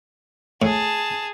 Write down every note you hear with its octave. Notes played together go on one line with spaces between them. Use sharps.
A2 G#4 A5